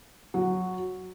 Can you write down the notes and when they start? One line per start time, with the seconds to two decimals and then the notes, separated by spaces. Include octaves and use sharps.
0.34 F#3